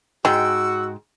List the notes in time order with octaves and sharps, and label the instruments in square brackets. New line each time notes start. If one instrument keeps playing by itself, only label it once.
[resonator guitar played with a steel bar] G#2 G5 [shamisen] G#3 [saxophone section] F#4 [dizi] E6